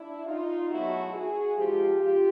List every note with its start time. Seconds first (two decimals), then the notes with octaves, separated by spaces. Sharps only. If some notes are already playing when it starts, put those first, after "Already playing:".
Already playing: D4 E4
0.26 D#4 F4
0.70 E2 B2 F#3 A3 E4 F#4
1.13 F#4 G#4
1.56 G#2 F3 G#3 F4 G4
2.00 F4 G4